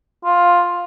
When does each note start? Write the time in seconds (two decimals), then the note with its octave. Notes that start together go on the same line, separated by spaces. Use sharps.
0.24 F4